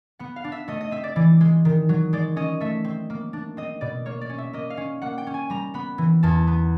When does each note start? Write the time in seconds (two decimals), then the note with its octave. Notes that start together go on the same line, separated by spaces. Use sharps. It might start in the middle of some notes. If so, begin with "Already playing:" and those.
0.19 B3 F#5
0.36 F5
0.44 D4
0.52 E5
0.68 A3 D#5
0.81 D#5
0.91 C4 E5
1.04 D5
1.16 E3 D5
1.41 G#3
1.65 D#3
1.89 F#3
2.13 G#3 D5
2.36 C#4 D#5
2.60 A3 E5
2.84 C4
3.10 A#3
3.33 D4
3.57 C4 D#5
3.81 B2 D5
4.06 A#3 C#5
4.21 D5
4.29 C#4
4.38 E5
4.53 A#3 D#5
4.70 F5
4.77 C#4
5.02 A#3 F#5
5.18 G5
5.27 C#4
5.34 G#5
5.50 G3 A#5
5.74 B3 B5
5.98 E3
6.23 E2 A5
6.47 B3